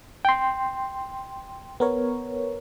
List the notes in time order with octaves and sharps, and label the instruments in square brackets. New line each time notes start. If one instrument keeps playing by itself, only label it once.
[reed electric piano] G5 C6
[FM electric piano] B3 A#4 C#5